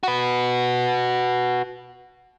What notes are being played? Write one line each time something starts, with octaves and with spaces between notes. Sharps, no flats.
F#4 B4